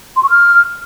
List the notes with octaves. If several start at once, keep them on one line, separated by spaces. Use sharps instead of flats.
C6
C#6
F6